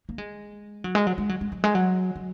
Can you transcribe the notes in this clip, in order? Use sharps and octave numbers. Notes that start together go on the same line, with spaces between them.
A#3
G#3
F#3
G#3
F#3
G#3
F#3
G#3
F#3
G#3
F#3
F#3